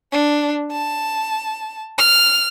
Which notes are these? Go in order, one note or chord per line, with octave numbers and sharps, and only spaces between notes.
D4
A5
F6